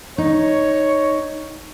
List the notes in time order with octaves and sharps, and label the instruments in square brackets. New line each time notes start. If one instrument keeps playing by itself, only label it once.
[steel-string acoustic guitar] D#4 [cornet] C#5